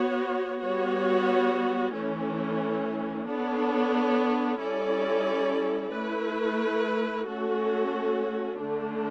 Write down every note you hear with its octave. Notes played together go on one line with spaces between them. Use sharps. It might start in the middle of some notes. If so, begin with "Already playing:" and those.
Already playing: B3 F#4 C#5
G3 B3 F#4 C#5
E3 A3 C#4
B3 D4 A4 C#5
G3 C#4 E4 A4 D5
A3 E4 B4
A3 C#4 F#4 A4
D3 A3 D4